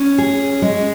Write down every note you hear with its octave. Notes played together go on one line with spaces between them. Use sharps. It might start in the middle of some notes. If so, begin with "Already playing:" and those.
Already playing: C#4
G#4
G#3